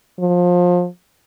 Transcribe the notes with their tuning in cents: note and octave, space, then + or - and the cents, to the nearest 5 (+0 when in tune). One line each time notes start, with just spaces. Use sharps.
F3 +25